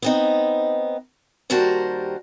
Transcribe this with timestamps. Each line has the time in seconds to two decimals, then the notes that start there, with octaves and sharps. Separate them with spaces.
0.02 B3 C4 D#4
1.50 D#2 G3 F#4 A#4 C5 A5